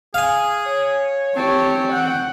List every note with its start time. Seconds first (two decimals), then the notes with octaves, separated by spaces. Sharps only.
0.14 G#4 F5 G#5
0.66 C#5
1.36 C4 G4 C#5 A5
1.93 F#5 G5